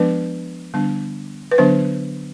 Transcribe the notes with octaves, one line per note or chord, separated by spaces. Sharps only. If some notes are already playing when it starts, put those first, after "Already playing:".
Already playing: F3 G#3 B3 D4 B4
D3 G3 B3 D4
B4
D3 F#3 B3 D4 C5